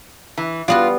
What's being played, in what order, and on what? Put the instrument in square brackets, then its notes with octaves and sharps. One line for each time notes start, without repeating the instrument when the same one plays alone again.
[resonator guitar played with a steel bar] E3
[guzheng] G3 B3 F#4 [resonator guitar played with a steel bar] F4